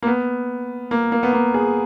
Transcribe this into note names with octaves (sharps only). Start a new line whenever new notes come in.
A#3
B3
A#3
A#3
B3
A#3
G#4